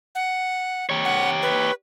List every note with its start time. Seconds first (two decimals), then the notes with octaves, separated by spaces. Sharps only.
0.15 F#5
0.89 G4 C#5
1.05 F#5
1.42 B4